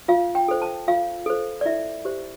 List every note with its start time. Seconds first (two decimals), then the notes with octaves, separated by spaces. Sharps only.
0.08 F4 F5
0.35 G5
0.48 A4 C5
0.62 A5
0.88 F4 F5
1.26 A4 C5
1.61 D5
1.65 E4 E5
2.05 G4 C5